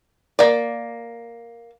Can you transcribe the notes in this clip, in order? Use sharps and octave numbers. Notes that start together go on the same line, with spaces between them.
A#3 D5